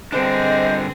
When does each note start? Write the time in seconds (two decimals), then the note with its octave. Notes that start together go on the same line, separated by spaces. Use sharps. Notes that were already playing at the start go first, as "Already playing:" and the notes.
0.12 G2 D3 C4 D4 G#4 C5 D#5